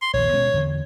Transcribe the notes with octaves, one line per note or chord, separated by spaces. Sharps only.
C6
A#1 D#2 C#5
B2 G#3 C#4
E2 D3